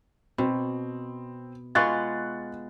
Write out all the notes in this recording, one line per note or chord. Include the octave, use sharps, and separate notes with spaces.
B2 C4
G#3 B3 F4 C#6 F#6 A6